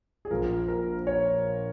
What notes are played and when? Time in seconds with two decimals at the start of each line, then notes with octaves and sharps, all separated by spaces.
0.25 G#4
0.30 A#1 A#2 F3 A#4
0.68 A#4
1.07 C#5